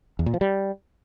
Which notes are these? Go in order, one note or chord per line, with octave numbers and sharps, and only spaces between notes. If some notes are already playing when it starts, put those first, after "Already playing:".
E2
A#2
F3
G3